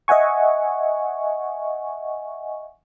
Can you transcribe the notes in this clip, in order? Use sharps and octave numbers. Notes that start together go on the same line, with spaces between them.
D#5 E5 F#5 G#5 C#6